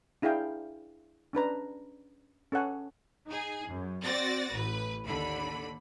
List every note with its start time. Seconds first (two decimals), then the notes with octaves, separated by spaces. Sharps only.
0.22 D4 E4 G#4 F5 G5
1.33 C#4 D4 B4 A#5
2.52 C#4 A4 C#5 F#5 G#5
3.27 D#4 G#4
3.67 F#2
4.03 C4 F#4 D5 A6 A#6
4.51 A1 B4
5.05 D#2 D3 B5